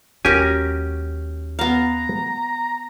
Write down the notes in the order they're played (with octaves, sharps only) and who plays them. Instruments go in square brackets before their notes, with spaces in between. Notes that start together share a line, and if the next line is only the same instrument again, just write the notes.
[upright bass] D#2 G#3 [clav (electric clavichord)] C#4 G4 G#5 [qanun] F#4 A#4
[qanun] B3 F5 [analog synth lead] A#5